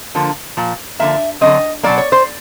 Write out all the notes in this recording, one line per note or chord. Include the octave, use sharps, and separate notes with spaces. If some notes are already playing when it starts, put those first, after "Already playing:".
D3 F3 A#3
A#2 F3
D3 F3 A#3 E5
D3 F#3 A3 C4 D#5
B2 F#3 A#3 D5
C#5
C5